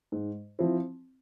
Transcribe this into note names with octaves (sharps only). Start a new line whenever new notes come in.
G#2
F3 C4 E4